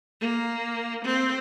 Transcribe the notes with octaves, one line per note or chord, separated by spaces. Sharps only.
A#3
C4